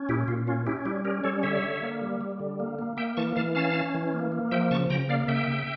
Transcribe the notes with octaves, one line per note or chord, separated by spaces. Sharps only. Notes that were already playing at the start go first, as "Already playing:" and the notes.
Already playing: C#4
A#2 E4 G4
A#2 F4
C#4 F4
C#4 E4 G4
G3 E4 G4
C#4 G4 A#4
G3 A4 C#5
D3 C#5 E5
D3
A#3
G3
G3
D3
A#3
A#3
A#3 E5 G5
E3 A5 C#6
E3 F5 A5
C#4 F5 A5
C#4
E3
A#3
A#3
F3 E5 G5
C#3 A5 C#6
C#3 G5 A#5
A#3 D5 F5
C#3 E5 G5
C#3